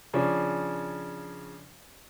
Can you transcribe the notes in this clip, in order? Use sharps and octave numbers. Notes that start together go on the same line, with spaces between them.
C#3 F3 D4 C#5